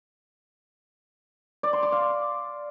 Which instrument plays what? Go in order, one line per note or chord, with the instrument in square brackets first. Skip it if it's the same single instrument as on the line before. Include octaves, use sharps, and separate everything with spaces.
[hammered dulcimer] D5
C6
D6
F5